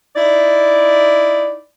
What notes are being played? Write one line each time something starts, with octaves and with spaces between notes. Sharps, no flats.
D#4 E4 D5